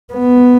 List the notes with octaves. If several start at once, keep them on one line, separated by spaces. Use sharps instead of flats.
B3